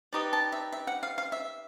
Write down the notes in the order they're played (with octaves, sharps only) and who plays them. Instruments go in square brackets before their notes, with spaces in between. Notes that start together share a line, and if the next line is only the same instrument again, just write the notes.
[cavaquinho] D#4 G4 B4 D5 D#6
A5
E5
E5
F#5
F5
F5
E5